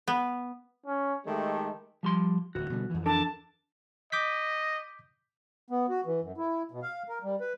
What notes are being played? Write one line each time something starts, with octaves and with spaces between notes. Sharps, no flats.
B3
C#4
D#3 G#3 A3 G4
F3 G3 C6
D1 D2 F#4
B2 D3 G3
F2 E3
D4 A4 A#4 A5
D#5 D6 G6 B6
B3
F#4
E3
F#2
E4
B2
F5
A#4
G3
B4